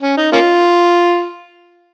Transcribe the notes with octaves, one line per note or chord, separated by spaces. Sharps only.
C#4
D#4
A#3 C#4 F4